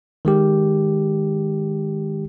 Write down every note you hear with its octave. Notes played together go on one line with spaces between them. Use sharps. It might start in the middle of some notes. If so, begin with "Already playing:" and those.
D#3 G#3 G4